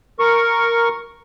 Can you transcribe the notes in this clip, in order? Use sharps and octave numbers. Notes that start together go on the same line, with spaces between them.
A#4 C#6